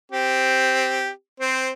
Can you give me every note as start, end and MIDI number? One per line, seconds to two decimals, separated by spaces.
0.12 1.09 60
0.12 1.09 67
1.40 1.70 60
1.40 1.70 72